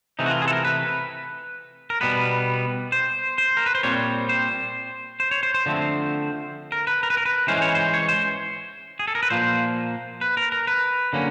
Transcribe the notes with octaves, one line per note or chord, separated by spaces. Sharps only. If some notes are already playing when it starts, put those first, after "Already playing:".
C3 E3 A3 D#4
F#4
F4
G#4
A4
A#4
B4
A#4
B2 G3 B3 B4
C5
C5
A#4
B4
C5
A#2 G3 C4 C#5
C5
C5
C#5
C5
C5
D3 F3 A3 C4
A#4
B4
A#4
B4
A#4
B4
E3 G#3 C#4 C5
C#5
C5
C#5
C5
G#4
A4
A#4
B4
A#2 F3 A#3 C5
B4
A#4
A#4
B4
D3 F#3 A#3 C#4